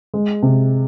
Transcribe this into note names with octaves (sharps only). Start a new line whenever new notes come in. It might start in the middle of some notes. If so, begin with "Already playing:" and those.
G#3
C3